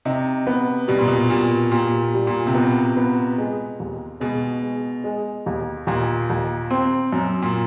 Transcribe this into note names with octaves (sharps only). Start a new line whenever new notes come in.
C3 D#4
B3
B2 G3
A#2
B2
A#2 G3
A#2 G4
G3
A#2
C3
B2 B3
B3
G#3
D#2
B2 G#3
G#3
G#3
D#2
D#2 A#2
D#2
C4
F#2
A#2